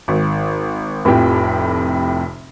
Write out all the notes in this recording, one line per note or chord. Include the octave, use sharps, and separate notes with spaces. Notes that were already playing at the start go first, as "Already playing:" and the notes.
G#1
F1 A2 C3 F3 G4